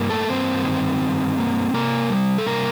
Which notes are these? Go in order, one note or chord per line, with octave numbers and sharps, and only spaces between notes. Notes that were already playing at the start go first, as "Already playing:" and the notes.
Already playing: G2 A#3
A3 A4
G2 C4 C5
D#3
G2
A#3
C3 A#3 A#4
G3
A4
C3 A#3 A#4